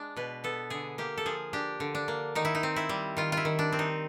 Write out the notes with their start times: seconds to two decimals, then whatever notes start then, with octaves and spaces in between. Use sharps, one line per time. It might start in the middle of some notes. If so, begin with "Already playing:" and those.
Already playing: G#3 D4
0.16 B2 B4
0.44 B3 A4
0.70 D3 G#4
0.98 A#3 G4
1.18 A4
1.26 F3 G#4
1.53 D4 G4
1.80 D3
1.95 D4
2.08 A#3
2.35 D#3 D#4
2.45 E4
2.55 D#4
2.63 C4
2.76 E4
2.89 G3
3.17 D#3 F4
3.32 E4 F4
3.45 D#3
3.59 D4
3.72 C4
3.79 D#4